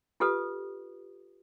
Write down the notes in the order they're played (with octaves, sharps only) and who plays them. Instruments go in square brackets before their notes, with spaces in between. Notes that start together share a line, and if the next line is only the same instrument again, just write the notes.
[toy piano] F4 G4 A4 B4 D#6